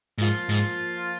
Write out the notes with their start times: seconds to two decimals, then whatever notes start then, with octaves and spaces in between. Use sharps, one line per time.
0.18 G#2 F3 A#3 F4
0.49 G#2